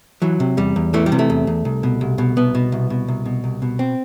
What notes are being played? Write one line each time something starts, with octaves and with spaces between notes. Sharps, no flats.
E3 F#3
C3
E2 G3
E2
E3 A3
G3
C3
A3
E2
E2
C2
B2
C2
B2
C2 B3
B2
C2
B2
C2
B2
C2
B2
C4